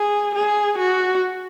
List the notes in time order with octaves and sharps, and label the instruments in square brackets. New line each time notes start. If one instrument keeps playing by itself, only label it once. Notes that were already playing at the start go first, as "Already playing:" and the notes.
Already playing: [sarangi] G#4
G#4
F#4